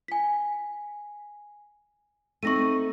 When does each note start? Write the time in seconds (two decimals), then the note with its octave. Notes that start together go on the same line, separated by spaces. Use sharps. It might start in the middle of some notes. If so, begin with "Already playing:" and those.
0.08 G#5 B6
2.43 A3 C4 D#4 C#6 A#6 D#7